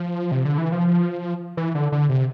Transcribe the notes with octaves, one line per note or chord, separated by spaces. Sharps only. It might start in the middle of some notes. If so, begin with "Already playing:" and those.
Already playing: F3
C3
D3
E3
F3
E3
D3
D3
C3